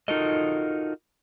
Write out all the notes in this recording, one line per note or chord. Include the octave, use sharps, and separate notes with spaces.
D#4 F4 F#4 A4 A#4 D#5